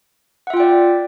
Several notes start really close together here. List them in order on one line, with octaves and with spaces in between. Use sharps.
F#5 E5 F4 G5 D5